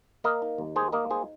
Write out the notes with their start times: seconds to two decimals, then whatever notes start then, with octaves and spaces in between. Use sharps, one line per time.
0.24 A#3 A#4 D#5
0.42 D#4
0.58 D#2
0.75 D#3 G#4 C5
0.92 A#3 A#4 D#5
1.10 D#4 G#4 C5